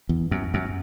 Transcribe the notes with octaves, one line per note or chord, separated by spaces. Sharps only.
E2
F#2
F#2